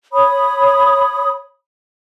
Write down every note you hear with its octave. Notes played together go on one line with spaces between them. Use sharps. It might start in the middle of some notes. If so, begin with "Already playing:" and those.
C#5 B5 D#6